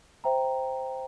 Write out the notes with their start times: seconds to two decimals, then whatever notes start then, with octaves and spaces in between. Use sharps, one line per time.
0.24 C5 E5 G5 A#5